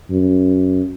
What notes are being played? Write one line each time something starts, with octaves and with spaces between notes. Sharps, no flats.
F#2